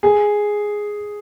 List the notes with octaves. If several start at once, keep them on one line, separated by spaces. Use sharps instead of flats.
G#4